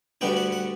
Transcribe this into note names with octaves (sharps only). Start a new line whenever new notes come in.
D2 D3 G3 B3 D4 G5
F#5
F#5